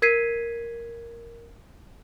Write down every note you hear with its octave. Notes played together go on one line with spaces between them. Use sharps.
A#4 G#6 B6 C7 D#7